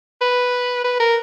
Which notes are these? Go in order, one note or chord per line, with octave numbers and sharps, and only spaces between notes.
B4
B4
A#4